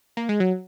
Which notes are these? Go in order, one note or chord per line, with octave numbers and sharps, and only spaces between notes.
A#3
G#3
F#3